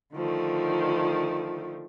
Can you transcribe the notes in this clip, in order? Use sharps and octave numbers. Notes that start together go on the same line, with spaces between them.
D3 D#3 F3 A3